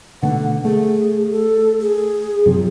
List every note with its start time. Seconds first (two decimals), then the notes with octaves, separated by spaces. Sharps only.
0.23 B2 D3 A3 F#5
0.65 A3 G#4
1.32 A4
1.81 G#4
2.46 F#2 C3 F3